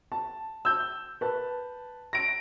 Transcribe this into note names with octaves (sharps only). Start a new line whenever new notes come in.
A5
E6 G6
B4 A5
A#6 D7